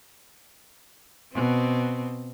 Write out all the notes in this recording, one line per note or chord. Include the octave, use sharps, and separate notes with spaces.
B2 C4